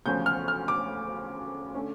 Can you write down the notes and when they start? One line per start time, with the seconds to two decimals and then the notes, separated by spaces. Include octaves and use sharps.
0.06 E1 D2 C#3 F3 C#4 G6
0.26 F6
0.48 F6
0.68 D6
1.74 D3 A3 C#4